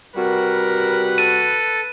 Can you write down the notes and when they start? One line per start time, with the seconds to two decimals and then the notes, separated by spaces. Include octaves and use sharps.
0.16 C3 G3 F#4 A#4 B4
1.18 A4 D#7